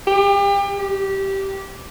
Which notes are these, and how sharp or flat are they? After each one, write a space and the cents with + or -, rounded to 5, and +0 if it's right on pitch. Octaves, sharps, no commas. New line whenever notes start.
G4 +35
G4 -15